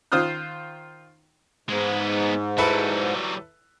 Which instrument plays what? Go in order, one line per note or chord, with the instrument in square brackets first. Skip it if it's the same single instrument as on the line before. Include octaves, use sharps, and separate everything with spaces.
[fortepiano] D#3 F4 C5 D#6 F6 F#6
[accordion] G#2 [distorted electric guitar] G#3 B3
[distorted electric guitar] F#3 G3 [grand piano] E4 A4 B4